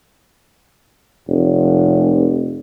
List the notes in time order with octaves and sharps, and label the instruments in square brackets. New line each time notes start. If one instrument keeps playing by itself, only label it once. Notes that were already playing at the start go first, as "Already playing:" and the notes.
[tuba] F1